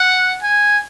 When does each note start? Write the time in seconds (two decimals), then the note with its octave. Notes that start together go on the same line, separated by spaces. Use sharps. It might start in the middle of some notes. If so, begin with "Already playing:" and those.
Already playing: F#5
0.43 G#5